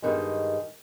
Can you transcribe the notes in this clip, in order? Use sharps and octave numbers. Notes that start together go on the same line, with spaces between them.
G2 D#3 G#3